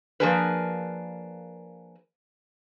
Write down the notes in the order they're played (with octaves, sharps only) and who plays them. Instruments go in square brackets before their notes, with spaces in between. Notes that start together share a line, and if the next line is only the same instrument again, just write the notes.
[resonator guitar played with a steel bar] F3 A#3 D4 G#4 A#4 B4